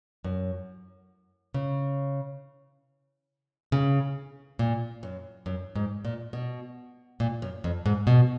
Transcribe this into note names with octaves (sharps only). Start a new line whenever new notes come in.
F#2
C#3
C#3
A#2
F#2
F#2
G#2
A#2
B2
A#2
F#2
F2
G#2
B2